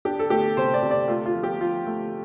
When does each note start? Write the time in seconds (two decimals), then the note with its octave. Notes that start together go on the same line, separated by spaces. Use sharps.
0.05 D4 G4
0.19 A4
0.30 A3 G4
0.57 C3 C5
0.74 D5
0.83 C3
0.91 D5
1.08 A3 F4
1.26 F4
1.34 F3
1.43 G4
1.60 F3 F4
1.86 A3